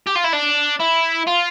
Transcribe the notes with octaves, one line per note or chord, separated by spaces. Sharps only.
G4
F4
E4
D4
E4
F4